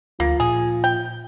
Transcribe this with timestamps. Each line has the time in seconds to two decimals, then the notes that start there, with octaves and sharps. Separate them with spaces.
0.20 D2 F3 A#3
0.40 A#2 G#4
0.84 G5